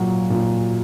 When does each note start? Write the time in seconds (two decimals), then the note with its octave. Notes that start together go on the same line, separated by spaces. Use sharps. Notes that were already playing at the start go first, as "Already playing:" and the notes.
Already playing: A#2 F#3
0.30 A#2